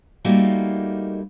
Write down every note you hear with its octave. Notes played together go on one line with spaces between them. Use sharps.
G3 A3 A#3 D#4 F4 F#4